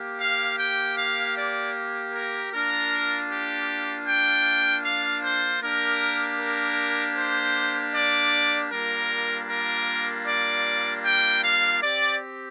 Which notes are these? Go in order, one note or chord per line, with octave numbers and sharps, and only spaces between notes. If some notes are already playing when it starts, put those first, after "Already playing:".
Already playing: A#3 G4
F5
G5
F5
D5
A#4
A#3 D4 F4 A#4
G4
G5
F5
C5
A#3 D4 G4 A#4
A#4
C5
D5
G3 A#3 D4 F4 A#4
A#4
D5
G5
F5
C4 G4 D5